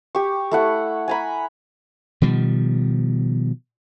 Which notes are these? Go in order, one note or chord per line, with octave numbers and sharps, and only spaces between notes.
G4 C#6
A3 E4 F#5
G#5 A#5 B5
B2 D#3 F3 G3